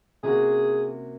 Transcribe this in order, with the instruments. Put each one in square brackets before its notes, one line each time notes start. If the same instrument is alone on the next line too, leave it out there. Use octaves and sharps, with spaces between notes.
[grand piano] C3 F3 A#3 C#4 F#4 [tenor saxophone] G#4